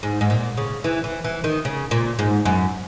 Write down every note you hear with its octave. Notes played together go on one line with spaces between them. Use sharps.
G#2
G#2
A#2
C#3
E3
E3
E3
D#3
C#3
A#2
G#2
F#2